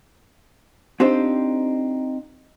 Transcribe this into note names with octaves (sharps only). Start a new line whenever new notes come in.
C4 D4 D#4 F4 G4 C5